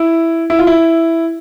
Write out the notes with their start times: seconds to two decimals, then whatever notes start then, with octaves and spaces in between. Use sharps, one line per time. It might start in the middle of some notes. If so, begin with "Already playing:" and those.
Already playing: E4
0.50 E4
0.59 F4
0.67 E4